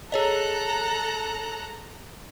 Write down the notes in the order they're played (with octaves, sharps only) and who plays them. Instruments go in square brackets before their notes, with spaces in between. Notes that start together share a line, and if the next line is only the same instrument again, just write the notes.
[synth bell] G#4 C#5 D#5 [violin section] A4 A#5 F#6